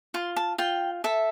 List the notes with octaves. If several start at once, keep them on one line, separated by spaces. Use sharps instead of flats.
F4 C6
A5
F4 G5
A4 E5